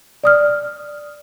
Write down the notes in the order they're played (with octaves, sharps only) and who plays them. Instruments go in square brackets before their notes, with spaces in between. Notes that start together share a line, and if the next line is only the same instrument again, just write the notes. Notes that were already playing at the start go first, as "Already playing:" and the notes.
[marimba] D5 D#6 F6